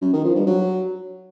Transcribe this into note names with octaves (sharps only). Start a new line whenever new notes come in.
F#2
D#3
F3
G2
F#3